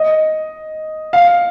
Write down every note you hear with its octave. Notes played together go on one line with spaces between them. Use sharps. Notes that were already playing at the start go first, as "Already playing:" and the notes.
Already playing: D#5
F5